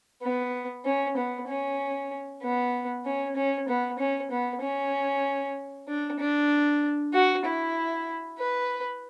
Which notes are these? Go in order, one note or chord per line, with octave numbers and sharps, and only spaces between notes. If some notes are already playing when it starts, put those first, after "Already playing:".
B3
C#4
B3
C#4
B3
C#4
C#4
B3
C#4
B3
C#4
D4
D4
F#4
E4
B4